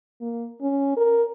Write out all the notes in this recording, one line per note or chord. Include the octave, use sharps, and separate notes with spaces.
A#3
C#4
A#4